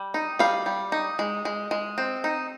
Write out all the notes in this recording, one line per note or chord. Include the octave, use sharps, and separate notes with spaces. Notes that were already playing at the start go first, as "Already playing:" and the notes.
Already playing: G3
D#4
G3 F5
G3
D#4
G#3
G#3
G#3
C4
D#4